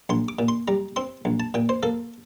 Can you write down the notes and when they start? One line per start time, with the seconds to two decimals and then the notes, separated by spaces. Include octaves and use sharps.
0.09 A#1 C6
0.29 D6
0.39 A#2
0.48 C6
0.68 G3 A#5
0.96 C4 C6
1.25 A#1
1.40 A5
1.54 A#2 G5
1.69 C5
1.83 A#3 A4